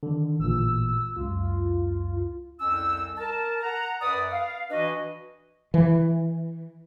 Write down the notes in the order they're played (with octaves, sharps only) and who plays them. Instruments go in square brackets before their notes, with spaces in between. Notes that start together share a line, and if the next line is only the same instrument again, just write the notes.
[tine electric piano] D3 D#3
[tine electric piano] A1 A#2 [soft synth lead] E6
[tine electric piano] C#2 F#2 [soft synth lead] F4
[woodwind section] C2 F2 C#4 E6
A#4 A5
F#5 A#5
F#2 B4 D5 F#5 D#6
F5
E3 D4 F#4 B4 D#5
[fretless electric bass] E3